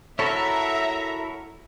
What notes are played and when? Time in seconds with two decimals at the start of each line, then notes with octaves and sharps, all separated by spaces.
0.19 E4 F#4 A4 A#4 C#5 E5 A#5